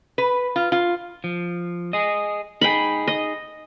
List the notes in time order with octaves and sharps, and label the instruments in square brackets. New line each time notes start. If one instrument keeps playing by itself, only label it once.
[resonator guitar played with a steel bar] B4
F4
F4
[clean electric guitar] F3
G#4 D#5
[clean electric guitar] D#4 G#4 [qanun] G5 B5
[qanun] D#5